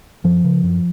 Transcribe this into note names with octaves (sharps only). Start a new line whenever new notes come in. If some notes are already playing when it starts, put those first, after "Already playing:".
F#2 F3
C#3
F#2